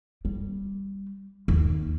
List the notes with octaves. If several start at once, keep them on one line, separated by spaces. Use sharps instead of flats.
G3
D#2